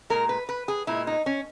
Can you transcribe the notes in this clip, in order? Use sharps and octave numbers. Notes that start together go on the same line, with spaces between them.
A#2 G#3 A#4
B4
B4
G#4
A#2 G#3 E4
D#4
C#4